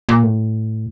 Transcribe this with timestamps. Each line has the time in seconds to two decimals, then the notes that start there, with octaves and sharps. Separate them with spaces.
0.09 A#2
0.23 A2